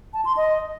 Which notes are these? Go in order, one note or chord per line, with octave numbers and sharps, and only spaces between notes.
A5
C6
D#5